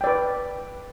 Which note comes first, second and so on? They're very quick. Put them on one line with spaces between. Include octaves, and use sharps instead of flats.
G5 D5 B4